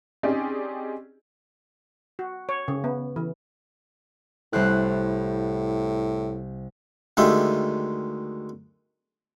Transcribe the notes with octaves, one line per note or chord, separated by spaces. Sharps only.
C4 C#4 D#4 G4 G#4 D5
F#4
C#5
C#3
B3
E3
C2 A2 C5 F#6
D2 D#3 G#3 G4 E5 F5